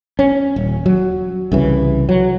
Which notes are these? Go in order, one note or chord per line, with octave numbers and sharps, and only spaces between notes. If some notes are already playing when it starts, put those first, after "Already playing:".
C#4
D#1
F#3
C2 C#3 E3
F#3